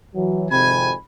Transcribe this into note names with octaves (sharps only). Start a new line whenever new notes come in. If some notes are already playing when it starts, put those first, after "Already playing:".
E3 F#3
G#1 F2 C3 G#5 B5